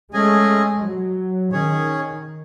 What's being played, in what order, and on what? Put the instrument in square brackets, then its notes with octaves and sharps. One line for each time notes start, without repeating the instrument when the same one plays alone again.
[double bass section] G#3 [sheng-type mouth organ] A3 C#4 G#4 D#5 G#5
[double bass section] F#3
[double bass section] D#3 [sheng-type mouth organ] C#4 G#4 C#5